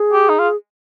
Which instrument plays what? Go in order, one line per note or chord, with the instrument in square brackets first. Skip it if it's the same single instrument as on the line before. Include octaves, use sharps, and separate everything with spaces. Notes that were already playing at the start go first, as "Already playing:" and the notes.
Already playing: [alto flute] G#4
[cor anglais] G4
D#4
F4